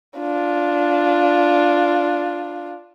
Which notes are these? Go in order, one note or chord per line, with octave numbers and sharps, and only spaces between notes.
D4 F4